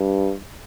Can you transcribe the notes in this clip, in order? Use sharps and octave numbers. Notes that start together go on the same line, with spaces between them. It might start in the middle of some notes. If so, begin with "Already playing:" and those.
Already playing: G2